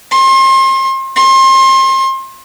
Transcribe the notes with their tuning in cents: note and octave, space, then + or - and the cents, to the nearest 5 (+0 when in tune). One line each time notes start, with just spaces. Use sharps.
C6 +35
C6 +30